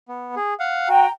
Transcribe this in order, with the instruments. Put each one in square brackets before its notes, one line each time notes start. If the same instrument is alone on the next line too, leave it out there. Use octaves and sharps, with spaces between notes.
[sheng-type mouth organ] B3
G#4
F5 F#5
[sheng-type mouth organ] F#4 [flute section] G5 A#5